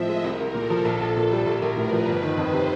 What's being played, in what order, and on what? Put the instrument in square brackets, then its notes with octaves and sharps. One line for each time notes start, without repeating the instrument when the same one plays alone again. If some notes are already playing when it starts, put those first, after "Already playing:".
Already playing: [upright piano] A2 F3 C4 [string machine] D#5 E5
[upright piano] G#3
[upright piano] C2 [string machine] A#4
[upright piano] C2
[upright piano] A#2 [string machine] A4
[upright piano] F3
A#1
A#1
A#2
G3
[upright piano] A#1 [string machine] A#4
[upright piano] A#1
[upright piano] A2 [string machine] B4
[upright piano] F3
G1
D#3
[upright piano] F2 [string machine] C5
[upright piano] C3